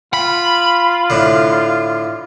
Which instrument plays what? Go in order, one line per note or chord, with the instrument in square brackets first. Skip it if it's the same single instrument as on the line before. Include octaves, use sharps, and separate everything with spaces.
[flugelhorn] F4 [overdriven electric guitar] B5
[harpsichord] A2 D3